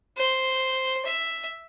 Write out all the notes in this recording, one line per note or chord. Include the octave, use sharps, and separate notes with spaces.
C5
E5